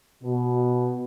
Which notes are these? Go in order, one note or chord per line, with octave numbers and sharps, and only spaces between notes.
B2